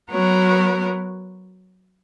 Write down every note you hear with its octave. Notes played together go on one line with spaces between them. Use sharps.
F#3 B3 F#4 A#4 C#5